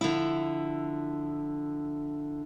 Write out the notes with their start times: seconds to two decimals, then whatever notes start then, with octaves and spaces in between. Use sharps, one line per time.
0.01 D3 F3 E4